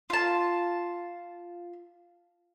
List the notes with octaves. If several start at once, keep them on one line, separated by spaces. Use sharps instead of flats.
F4 A5